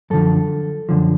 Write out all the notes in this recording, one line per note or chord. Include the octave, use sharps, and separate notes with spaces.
F#2 D3 F3 A4
F#2 D3 F3